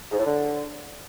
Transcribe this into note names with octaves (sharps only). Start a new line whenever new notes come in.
G#2
A2
D3